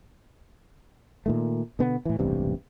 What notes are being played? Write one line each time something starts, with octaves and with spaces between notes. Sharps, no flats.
A#2 D#3 A3
B2 D3 B3
A2 E3
E1 A1 G2 C3